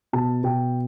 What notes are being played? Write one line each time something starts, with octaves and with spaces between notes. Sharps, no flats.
B2 A5
B2 G5